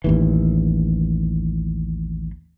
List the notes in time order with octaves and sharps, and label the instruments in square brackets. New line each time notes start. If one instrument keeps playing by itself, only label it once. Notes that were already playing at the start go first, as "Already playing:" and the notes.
[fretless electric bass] A1 D#2 E3